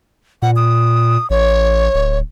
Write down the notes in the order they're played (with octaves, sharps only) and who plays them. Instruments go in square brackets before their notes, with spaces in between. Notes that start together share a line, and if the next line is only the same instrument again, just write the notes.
[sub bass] A#2 [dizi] F#5
[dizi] D#6
[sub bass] A1 [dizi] C#5
[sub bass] D1